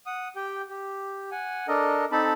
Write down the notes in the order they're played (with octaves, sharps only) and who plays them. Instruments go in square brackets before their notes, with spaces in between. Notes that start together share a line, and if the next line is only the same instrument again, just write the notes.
[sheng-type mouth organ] F#5 D#6
G4 G5
G4
F#5 G#5
D4 A4 A#4 D#5
C4 D#4 A4 A5 B5